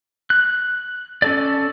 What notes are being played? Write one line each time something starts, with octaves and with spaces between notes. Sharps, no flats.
F#6
C#4 A4 D5